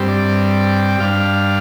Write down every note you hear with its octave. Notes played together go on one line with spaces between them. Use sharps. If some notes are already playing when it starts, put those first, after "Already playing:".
Already playing: G2 G3 C4
D5
G5
G2 G3 D4 F5